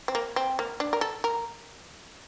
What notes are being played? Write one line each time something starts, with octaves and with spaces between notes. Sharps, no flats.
C4
A#3
C4
A#3
D4
A#4
A4
A#4